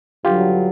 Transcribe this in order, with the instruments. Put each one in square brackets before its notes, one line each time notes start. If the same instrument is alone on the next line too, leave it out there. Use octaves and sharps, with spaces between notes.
[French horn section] G2 D3 F#3 [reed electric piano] F4 G4